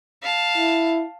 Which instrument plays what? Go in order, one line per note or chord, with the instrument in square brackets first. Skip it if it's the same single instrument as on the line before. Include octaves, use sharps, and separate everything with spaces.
[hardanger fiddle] F5 A5
[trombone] E4